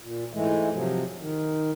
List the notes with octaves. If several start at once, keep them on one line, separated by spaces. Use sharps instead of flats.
A#2
G#2 E3 G#3 A3
C3 F3 F#3
D#3